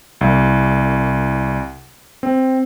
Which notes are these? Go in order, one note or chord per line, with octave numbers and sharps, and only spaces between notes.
C2
C4